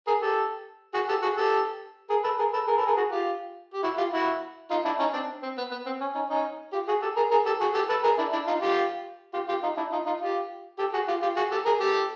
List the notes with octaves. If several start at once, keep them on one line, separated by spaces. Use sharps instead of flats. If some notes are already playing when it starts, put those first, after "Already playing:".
G#4 A#4
G4 A4
F#4 G#4
G4 A4
F#4 G#4
G4 A4
G#4 A#4
A4 B4
G#4 A#4
A4 B4
G#4 A#4
A4 B4
G#4 A#4
F#4 G#4
F4 G4
G4
E4 F#4
F4 G4
E4 F#4
D#4 F4
D4 E4
C#4 D#4
C4 D4
C4
B3
B3
C4
C#4
C#4 D#4
C#4 D#4
F4 G4
F#4 G#4
G4 A4
G#4 A#4
G#4 A#4
G4 A4
F#4 G#4
G4 A4
A4 B4
G#4 A#4
D4 E4
D4 E4
D#4 F4
F4 G4
F4 G4
F4 G4
D#4 F4
D4 E4
D#4 F4
D#4 F4
F4 G4
G4 A4
F#4 G#4
F4 G4
F4 G4
F#4 G#4
G4 A4
G#4 A#4
G4 A4